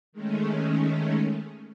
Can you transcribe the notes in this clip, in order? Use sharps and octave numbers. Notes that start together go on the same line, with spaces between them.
D#3 G#3 A3 C#4